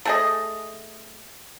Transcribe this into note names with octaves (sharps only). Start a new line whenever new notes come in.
A3 G#4 D#5